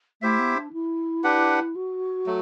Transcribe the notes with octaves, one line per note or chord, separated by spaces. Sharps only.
A3 E4 G4 C5 E5
B3
D4
E4
D4 G4 B4 F#5
F#4
F#3 A3